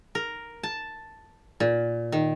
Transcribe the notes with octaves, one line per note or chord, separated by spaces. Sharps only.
A#4
A5
A#2
D#3